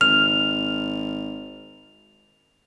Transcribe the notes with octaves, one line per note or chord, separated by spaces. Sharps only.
G#1 F6 F7